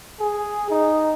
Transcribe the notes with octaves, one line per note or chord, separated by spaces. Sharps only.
G#4
D#4